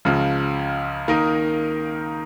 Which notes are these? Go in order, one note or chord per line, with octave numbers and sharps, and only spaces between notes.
C#2 C#3 F3
D#3 A#3 D#4 A#4